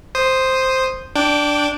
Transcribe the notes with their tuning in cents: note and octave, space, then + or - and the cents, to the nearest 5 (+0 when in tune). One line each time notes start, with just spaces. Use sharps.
C5 +0 D#6 -5
D4 +0 G5 +0 D6 -20